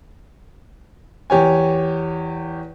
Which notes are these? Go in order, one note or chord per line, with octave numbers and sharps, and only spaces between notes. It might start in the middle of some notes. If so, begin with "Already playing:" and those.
E2 G4 C#5 G#5